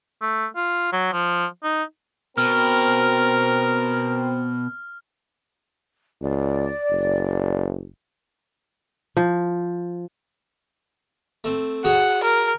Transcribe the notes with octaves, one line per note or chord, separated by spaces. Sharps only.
A3
F4
F#3
F3
D#4
B2 C4 A#4 F6
C#2 D5
F#1
F3
A3 C4
F#4 G#4 C#5 F#5
A#4